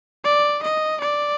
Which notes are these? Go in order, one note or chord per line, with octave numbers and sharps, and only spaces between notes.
D5
D#5
D5